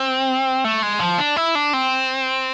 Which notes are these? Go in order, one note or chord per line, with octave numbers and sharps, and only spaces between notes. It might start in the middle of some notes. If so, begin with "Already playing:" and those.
Already playing: C4
A3
G#3
F3
D4
E4
D4
C4